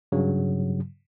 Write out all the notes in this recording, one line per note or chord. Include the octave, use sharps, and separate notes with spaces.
G2 C#3 F#3